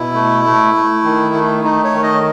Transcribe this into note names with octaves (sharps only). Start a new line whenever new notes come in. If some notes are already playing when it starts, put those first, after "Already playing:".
Already playing: B2 E4
A3
A3
A3
D#3
A3
A3 D#4
C#5
D#3
D#5